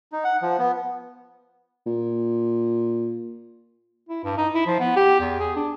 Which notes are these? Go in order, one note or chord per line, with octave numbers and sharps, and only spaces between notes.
D#4
F#5
F3
B3
A#2
E4
G2
D#4
E4
F3
B3
G4
E2
G#4
D4